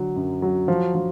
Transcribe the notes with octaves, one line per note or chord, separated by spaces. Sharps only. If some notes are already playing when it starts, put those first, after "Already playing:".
Already playing: D3 F#3
F#2
F#3
F3
F3